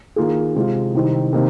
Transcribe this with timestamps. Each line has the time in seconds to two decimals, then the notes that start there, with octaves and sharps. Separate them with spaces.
0.16 D#3 A#3 F4 G#4
0.55 C3 G#3 F4
0.94 C2 C3 D#3 C4 D#4
1.33 C3 D#3 A#3 D#4